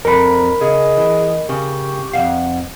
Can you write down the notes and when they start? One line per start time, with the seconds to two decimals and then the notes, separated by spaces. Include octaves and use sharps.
0.05 F2 A4 A#4 A#5 B5
0.61 C#3 G#4 D#5
0.97 E3
1.49 C#3 G4 C#6
2.13 F2 E3 F5 F#5